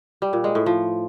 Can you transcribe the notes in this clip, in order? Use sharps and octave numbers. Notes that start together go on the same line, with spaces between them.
G3
A#2
G#3
A2
F3